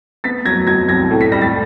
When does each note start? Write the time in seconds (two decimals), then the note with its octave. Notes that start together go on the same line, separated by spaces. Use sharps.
0.24 B3 A6 B6
0.46 F#3 G#6 A#6
0.67 F#3 G#6 A#6
0.89 C2 G#6 A#6
1.11 A2
1.21 B6
1.32 G3 A#6
1.42 A6 B6